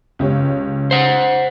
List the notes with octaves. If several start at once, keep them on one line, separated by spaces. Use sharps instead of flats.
C#2 G4 C#5
C5 F#5